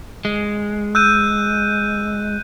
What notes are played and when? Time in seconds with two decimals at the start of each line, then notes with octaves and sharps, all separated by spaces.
0.25 G#3
0.95 E6 F#6 G6 D#7